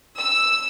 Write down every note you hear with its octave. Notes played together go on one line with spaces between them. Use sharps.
E6